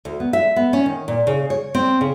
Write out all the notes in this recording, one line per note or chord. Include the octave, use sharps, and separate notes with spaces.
D2
B3
E5
B3
C#4
D#3
A#2
C#3
C#5
C4
C#3